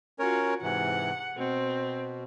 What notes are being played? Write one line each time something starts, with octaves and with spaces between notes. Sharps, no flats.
C#4 F4 F#4 A#4 C#5
G#2 C3 E3 F#5
B2 C4